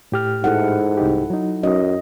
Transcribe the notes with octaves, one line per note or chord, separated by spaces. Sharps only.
A2 G4 F6
G#2 E4 A4 F#5
C2 D#4 G4
F#3 D#4
F#2 D#5